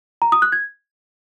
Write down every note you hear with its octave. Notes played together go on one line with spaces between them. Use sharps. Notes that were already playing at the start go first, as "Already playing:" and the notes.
A#5
D#6
F#6
G#6